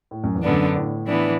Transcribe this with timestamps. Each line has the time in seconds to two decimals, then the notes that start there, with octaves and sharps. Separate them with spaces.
0.11 A2
0.24 F#2
0.36 E2
0.43 F#2 D3 B3 D4
0.76 A2
1.07 E3 B3 D4